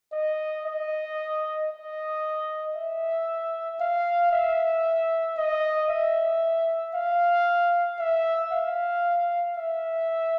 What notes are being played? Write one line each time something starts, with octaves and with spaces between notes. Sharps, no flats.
D#5
D#5
D#5
E5
F5
E5
D#5
E5
F5
E5
F5
E5